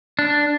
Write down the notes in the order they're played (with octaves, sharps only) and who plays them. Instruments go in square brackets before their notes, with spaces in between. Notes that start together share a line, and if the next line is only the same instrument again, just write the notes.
[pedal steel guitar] D4